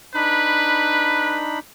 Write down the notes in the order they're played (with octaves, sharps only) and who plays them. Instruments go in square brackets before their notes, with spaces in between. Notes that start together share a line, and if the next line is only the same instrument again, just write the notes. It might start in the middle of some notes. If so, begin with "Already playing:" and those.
[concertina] D4 D#4 B5 [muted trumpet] B4